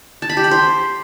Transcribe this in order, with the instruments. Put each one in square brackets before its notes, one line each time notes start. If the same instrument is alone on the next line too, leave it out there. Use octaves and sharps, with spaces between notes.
[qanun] A5
B5
G4
B5
C5